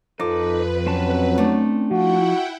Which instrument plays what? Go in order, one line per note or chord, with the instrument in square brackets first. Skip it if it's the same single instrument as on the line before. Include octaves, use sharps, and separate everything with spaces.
[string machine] F2 B4 [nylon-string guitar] F3 [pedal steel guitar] D#4 D6 [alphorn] A4
[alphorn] F#3 [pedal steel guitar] C4 C#4 A5
[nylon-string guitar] A3 D4 D#4
[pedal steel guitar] F3 [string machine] E4 F#5 G5 [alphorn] F#4